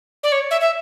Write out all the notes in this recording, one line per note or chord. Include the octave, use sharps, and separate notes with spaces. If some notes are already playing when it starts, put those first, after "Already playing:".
D5
C#5
E5
E5